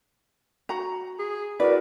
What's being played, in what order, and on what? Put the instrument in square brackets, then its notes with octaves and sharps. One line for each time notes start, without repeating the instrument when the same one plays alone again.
[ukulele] F#4 A#5
[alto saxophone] G#4
[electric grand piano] E4 F#4 A#4 [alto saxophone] B4 [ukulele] D5